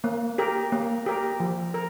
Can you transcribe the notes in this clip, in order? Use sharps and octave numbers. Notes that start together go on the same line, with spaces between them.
A#3
G4 A#4
A#3
G4 A#4
F3
A#4